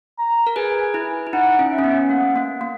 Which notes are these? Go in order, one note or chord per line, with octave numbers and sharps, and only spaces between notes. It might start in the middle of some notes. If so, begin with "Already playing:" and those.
A#5
A#4
G#4 B4 G#5
E4
E4
D#4 F#5
C#4
E5
C#4
B3
A#3 F#5
A#3
A#3